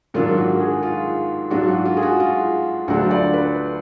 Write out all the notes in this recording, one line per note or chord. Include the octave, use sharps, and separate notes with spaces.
G#2 D#3 F#3 A#3 D4 F4
F#4
G#4
F4
G#2 F#3 D4 F4 F#4
F#4
F4
G#4
F#4
F4
D2 D3 F#3 D4 F4 F#4
D5
B4